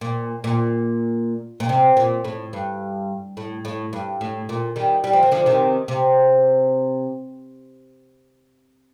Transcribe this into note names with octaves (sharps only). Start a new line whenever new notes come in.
A#2
A#2
A#2
C3
A#2
A2
G2
A2
A2
G2
A2
A#2
D#3 G3
G3
F3
D#3
D3 F3
C3 D#3
C3